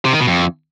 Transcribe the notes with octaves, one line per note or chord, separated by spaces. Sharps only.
C3
D#3
B2
F2